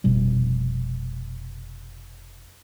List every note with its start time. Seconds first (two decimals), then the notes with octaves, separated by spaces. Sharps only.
0.04 F1 B2 G3